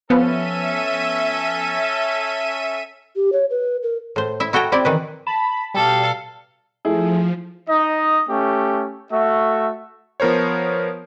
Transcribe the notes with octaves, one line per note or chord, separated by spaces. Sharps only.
F3 B3 C#4 A4 E5 D#7
G4
C#5
B4
A#4
A2 C5
E4 E5
E4 F#4 A4 G5 A#5
C4 E4 D5
D#3 E3 B4
A5 B5
B2 G3 G4 A4 F5
F3 A3 E4 G#4
D#4 D#5
A3 C#4 G4
A3 F#4 E5
F3 B3 A#4 C5 C#5